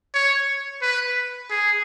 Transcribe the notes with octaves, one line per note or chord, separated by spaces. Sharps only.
C#5
B4
G#4